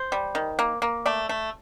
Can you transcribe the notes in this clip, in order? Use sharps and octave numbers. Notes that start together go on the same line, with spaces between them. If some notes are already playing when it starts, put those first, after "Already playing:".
Already playing: C5
G3
D#3
A#3
A#3
A3 D5
A3